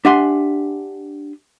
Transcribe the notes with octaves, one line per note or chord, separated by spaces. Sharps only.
D4 G4 E5 F#5 G#5 C6